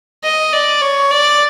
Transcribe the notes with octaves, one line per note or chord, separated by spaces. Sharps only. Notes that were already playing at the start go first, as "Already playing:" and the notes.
D#5
D5
C#5
D5